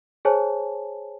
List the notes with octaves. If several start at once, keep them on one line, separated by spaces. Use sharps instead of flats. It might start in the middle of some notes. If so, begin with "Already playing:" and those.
G#4 C5 C#5 G#5 A5